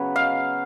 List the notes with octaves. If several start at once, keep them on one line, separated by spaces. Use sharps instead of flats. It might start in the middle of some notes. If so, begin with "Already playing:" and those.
Already playing: C#3 F#3 B3 B4
F5